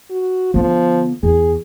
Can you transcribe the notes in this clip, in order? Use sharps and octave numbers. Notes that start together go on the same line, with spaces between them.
F#4
D3 F3 B3
E2 G#4